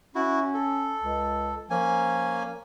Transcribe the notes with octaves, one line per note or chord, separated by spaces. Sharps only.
C#4 E4 F#4
A4
C#2
F3 A#3 C#4 G#5